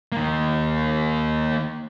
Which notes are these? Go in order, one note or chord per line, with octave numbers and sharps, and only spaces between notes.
D#3 A#3